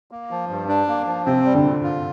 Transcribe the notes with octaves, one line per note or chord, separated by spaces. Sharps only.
A#3
F3
G2
D4
A#3
F3
C3 C4
G3
D3
A#2
F4